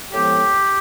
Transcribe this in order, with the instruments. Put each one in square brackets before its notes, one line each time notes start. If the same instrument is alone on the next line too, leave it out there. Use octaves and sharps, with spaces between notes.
[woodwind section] A2 F3 G#3 B3 G4